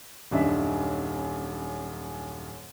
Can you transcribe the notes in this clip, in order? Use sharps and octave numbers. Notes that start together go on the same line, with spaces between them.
D#1 F#2 D4 D#4 E5